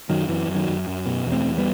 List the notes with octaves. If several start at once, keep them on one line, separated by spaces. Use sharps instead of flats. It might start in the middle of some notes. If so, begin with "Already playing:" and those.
F#2 D#3 F#3
F#2 E3
F#2
D#3 F#3
F#2
F#2
B2
E2
A3 C4
E2
G3 B3